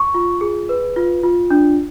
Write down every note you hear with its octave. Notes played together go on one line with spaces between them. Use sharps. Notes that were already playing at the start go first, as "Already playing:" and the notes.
Already playing: C#6
F4
G#4
B4
F4
F4
D4